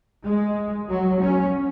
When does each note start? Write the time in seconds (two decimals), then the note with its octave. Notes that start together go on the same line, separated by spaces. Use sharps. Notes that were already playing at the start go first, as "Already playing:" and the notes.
0.25 G#3
0.90 F#3
1.23 C#4